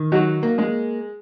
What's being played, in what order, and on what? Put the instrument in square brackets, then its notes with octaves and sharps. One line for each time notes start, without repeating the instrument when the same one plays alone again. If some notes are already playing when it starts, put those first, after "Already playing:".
Already playing: [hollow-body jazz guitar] D#3
[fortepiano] F#3 F#4 [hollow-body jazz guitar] D#4
[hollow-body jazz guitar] A#3
[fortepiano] G#3 G#4